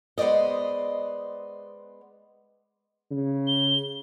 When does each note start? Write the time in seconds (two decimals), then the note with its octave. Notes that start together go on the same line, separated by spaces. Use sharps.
0.18 G#3 B3 C5 D5 D#5
3.11 C#3
3.47 G7